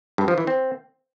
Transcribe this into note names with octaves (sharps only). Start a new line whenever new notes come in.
G2
F3
E3
C4